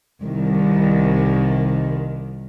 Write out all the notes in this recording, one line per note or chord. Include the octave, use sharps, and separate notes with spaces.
C2 D#3